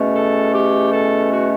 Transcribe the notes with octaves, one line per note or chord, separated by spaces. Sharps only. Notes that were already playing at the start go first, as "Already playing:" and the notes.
Already playing: E2 B2 A3 C#4
A4
G4
A4
F#4